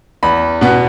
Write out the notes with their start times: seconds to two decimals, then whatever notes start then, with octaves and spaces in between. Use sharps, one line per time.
0.23 E2 B5
0.61 B2 B3